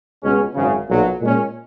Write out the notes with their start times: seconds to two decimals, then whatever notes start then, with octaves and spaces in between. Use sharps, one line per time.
0.22 C#2 B2 G#3 C#4
0.55 G#1 F#2 C#3
0.87 B1 A#2 F#3
1.19 A#2 G#3 C#4